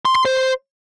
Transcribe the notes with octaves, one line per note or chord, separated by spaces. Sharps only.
C6
C6
C5